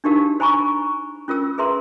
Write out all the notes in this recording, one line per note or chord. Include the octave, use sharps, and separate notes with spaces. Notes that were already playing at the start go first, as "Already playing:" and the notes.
D4 D#4 F#4 G4 A#4 F5
C5 G#5 A#5 B5 C#6
C#4 F4 A#4 E6
G#4 A#4 B4 E5 A#5 C6